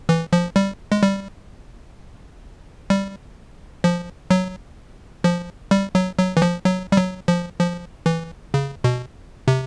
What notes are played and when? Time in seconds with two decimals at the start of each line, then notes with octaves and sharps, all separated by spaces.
0.09 E3
0.33 F3
0.56 G3
0.92 G#3
1.03 G3
2.90 G3
3.84 F3
4.30 F#3
5.24 F3
5.71 G3
5.95 F#3
6.18 F#3
6.37 E3
6.42 F3
6.65 F#3
6.92 G3
6.97 F#3
7.28 F3
7.59 F3
8.06 E3
8.54 C#3
8.84 B2
9.48 C3